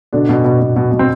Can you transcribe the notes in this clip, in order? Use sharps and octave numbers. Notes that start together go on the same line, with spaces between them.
B2 D3 D4
B2
B2
B2
B2
B2
C4